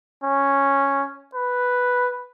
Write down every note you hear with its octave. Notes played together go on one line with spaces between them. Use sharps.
C#4
B4